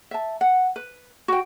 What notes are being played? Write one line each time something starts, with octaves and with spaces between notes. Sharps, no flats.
E5 A5
F#5
B4
F#4 G5